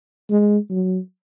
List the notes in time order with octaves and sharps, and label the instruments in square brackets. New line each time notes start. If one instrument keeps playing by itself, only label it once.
[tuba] G#3
F#3